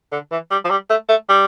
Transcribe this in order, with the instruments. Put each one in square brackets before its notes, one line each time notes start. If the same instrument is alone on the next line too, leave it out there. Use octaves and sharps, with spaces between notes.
[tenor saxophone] D3
E3
G3
F3
G3
A3
A3
G3